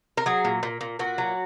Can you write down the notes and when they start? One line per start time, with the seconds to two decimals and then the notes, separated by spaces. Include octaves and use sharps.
0.17 A#4
0.26 F#3 G#4
0.45 A#2
0.63 A#2
0.81 A#2
0.99 A#2 F#4
1.18 F#3